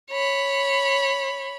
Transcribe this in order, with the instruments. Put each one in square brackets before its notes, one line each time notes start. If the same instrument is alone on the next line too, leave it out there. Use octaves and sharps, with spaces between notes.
[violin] C#5 B5